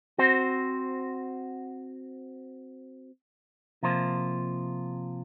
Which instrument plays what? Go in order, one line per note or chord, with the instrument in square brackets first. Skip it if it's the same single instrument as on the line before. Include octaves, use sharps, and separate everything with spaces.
[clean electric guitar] C4 F#4 C5
C3 F3 A#3 F4 C5